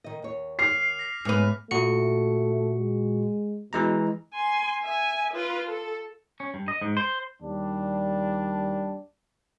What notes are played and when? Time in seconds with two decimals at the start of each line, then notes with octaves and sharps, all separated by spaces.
0.04 D#3 D#5
0.22 D#2 C#5
0.59 D6 F6 C7
0.99 A#6 B6
1.25 G#2 A3 B3 B4 G#5 D6 F6
1.71 A#2 A3 F#4 C#7
2.80 G#3
3.73 B2 E3 G#3 A#5
4.35 G#5 C6
4.83 E5 G#5
5.34 F4 B4
5.67 A4
6.40 C#4
6.54 G2
6.68 D#5
6.82 G#2
6.97 C5
7.41 D#2 G3 D4